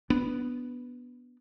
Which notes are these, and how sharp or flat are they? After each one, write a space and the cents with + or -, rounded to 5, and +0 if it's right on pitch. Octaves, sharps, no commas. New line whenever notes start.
B3 -5 D4 -10